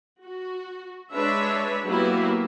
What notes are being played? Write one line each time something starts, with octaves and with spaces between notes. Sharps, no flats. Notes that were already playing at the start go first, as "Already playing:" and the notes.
F#4
G#3 D4 B4 C#5 E5
F#3 A#3 B3 E4 F#4 G4